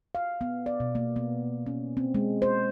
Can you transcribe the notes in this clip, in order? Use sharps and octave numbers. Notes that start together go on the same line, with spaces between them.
F5
B3
D5
B2
A#3
B3
C#4
C4
G#3
C5